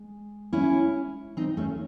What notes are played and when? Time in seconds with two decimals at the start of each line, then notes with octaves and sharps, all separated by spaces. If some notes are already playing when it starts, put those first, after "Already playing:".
Already playing: G#3
0.53 C#4 E4
1.37 C4 D#4
1.57 A3 C#4